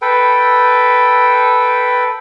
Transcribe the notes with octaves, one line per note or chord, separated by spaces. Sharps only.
A4 B4 G5